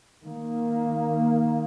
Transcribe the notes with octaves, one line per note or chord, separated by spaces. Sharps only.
D#3 A#3